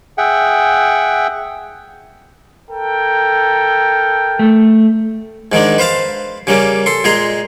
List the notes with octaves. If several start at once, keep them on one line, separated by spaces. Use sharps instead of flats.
G#4 E5 F#5 G5
A4 A#4 G5
A3
G#2 D#3 G#3 D4
B4 C5 F5 A5
C#3 G3 A#3 C#4
A4 C6
A#2 G#3 G#4 A#5 C6